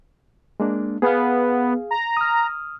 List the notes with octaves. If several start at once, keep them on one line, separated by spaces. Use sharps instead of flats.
G#3 A#3 D4
B3 G#4 F5
A#5
D#6 F6